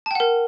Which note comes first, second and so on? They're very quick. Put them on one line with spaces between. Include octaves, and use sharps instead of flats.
A5 G5 F#5 A#4